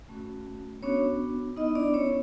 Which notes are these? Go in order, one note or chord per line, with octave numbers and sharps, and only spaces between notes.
A3 C#4 F#4
B3 C#4 D4 F#4 C#5
B3 D#4 E4 D#5
D4 D5
C#4 C#5